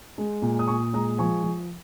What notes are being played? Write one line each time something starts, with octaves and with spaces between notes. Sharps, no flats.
G#3
A#2
D#6
A#2 G#5 C#6
G#3 A#5 D#6
F3 G#5 C#6
F3